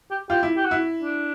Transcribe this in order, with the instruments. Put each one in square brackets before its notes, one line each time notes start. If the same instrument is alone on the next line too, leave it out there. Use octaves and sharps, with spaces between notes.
[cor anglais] G4
[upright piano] F4 [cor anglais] G4
[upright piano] E4
[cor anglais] G4
F#4
[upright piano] E4
[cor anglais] D4